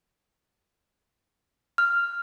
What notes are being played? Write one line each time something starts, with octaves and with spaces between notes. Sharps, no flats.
F6